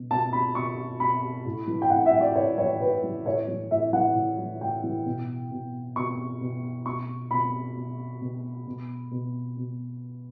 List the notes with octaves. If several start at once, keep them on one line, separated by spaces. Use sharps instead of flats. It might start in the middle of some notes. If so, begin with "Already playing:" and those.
Already playing: B2
B2 A5
B5
B2 C#6
B2 B5
A2
E3
G5
A2 F#5
E5
E3
D5
A2 C#5
E3 C#5
A2 B4
E3
A2 C#5
E3
A2 E5
E3 F#5
A2
E3
A2 G5
E3
B2
B2
B2 C#6
B2
B2 C#6
B2 B5
B2
B2
B2
B2
B2